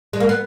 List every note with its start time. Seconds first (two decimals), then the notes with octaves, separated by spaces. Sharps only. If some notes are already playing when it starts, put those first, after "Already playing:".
0.13 G#3
0.20 A#3
0.29 B3